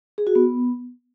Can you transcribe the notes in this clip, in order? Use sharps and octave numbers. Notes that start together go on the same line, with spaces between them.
G#4
F#4
B3